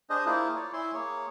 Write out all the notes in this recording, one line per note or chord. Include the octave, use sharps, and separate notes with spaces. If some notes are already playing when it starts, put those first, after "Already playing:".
D4 G#4 C5 D#5
A#3 E4 F4 G#4 C5
C#5 D5
E4 E5 G#5 C6
A#3 G#4 C#5